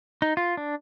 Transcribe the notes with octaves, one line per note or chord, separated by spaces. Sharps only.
D#4
F4
D4